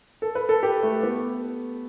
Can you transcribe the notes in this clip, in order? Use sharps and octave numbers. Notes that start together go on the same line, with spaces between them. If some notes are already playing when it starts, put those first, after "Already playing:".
A4
B4
A4
G4
A3
B3